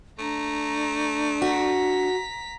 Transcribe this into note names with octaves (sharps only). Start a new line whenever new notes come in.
A3 D4 A#5
F#4 A#5 B6